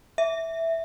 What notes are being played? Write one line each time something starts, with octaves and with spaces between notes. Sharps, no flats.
E5